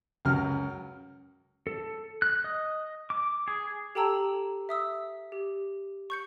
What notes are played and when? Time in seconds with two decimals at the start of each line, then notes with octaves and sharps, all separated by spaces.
0.25 C#2 F#2 F6
1.67 A4
2.22 F#6
2.44 D#5
3.10 D6
3.48 G#4
3.95 G4 A4 G5 A5 A#5 E6
4.69 E5 D#6 E6
5.32 G4
6.10 C#6 G6 C#7